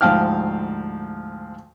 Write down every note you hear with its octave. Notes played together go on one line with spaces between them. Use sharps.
D2 G#2 F3 F5 G5 F6